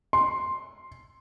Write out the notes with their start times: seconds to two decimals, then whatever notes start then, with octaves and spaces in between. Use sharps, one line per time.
0.13 C6